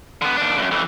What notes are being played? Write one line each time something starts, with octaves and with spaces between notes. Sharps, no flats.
D3 B3
D#2 D4
C#2 F#2
F2 E3